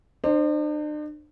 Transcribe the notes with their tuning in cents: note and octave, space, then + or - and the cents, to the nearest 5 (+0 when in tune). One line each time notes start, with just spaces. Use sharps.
D4 +45 C5 +5